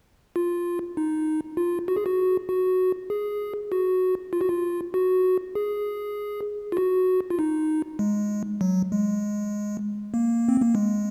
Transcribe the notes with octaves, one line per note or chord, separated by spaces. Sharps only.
F4
D#4
F4
F#4
G#4
F#4
F#4
G#4
F#4
F4
F#4
F4
F#4
G#4
F4
F#4
F4
D#4
G#3
F#3
G#3
A#3
C4
A#3
G#3